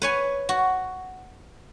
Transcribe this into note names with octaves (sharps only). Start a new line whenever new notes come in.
B4 C#5 G#5
F#4